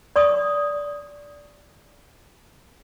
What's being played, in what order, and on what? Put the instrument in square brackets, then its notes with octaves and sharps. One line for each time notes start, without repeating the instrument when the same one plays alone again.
[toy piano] D5 C#6 D#6